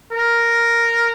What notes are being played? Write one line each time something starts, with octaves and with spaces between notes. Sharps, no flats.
A#4